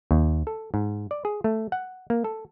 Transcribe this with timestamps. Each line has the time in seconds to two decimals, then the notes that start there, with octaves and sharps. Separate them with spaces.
0.11 D#2
0.47 A4
0.74 G#2
1.11 D5
1.25 G#4
1.44 A3
1.72 F#5
2.10 A#3
2.24 A4